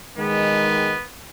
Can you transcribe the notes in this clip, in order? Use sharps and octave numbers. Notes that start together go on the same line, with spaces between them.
D#3 G#3 B3